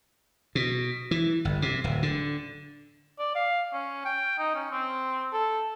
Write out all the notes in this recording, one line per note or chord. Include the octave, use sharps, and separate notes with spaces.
B2
E3
G1
C3
D1
D3
D5
F5
C#4
G5
D#4
C#4
C4
A4